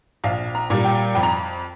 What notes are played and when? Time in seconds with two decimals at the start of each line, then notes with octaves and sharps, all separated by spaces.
0.24 A#1 F5
0.55 A#5
0.70 A#2 G3
0.85 G5
1.15 F2 G5
1.23 A#5